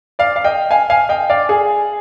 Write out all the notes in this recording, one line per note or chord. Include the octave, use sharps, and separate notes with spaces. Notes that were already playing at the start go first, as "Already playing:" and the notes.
D5 F5
F5
D#5 G5
F5 G#5
F5 G#5
D#5 G5
D5 F5
G#4